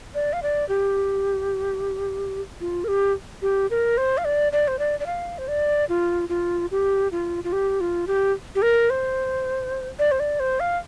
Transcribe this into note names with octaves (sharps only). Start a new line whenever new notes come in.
D5
F5
D5
G4
F4
A#4
G4
G4
A#4
C5
F5
D5
D5
C5
D5
D5
F5
C5
D5
F4
F4
G4
F4
F4
G4
F4
G4
G4
A#4
C5
D5
C5
D5
C5
F5